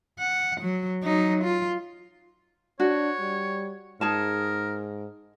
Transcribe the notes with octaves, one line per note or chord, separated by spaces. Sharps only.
F#5
F#3
F#3 D#4
F4
D4 F#4 C#5
G3
G#2 D#4 G#4 A#4 A5